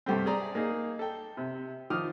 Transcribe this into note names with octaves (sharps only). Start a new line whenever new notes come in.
G2 C3 G3 A3 C4
G#4 D5 A#5
A#3 D#4 G#4
A4 G5
C3
D#3 F3 D6 D#6 F6